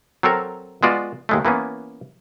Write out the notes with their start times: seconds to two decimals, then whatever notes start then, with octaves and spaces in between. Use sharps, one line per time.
0.23 F#3 C4 A4 A#4
0.83 G#3 B3 F4 F#4 D5
1.29 D#2 G#3 A3
1.45 E3 A#3 B3 C#4